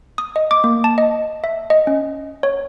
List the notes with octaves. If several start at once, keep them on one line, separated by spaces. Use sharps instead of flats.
D#6
D#5
D6
A#3
A5
D#5
E5
D#5
C#4
C#5